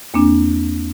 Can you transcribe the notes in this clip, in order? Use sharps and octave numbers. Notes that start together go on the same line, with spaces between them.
E2 A#3 C4 D4